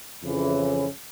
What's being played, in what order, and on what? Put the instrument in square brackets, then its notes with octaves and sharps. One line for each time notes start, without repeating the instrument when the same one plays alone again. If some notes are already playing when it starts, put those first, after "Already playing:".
[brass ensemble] F2 C#3 E3